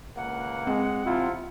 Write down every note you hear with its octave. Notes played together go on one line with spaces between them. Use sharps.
C#2 A#3 F#5
G#3 C4
C3 F3 E4 F4